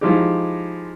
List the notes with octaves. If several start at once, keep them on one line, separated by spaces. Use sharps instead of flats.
F3 G#3 D#4 E4 G4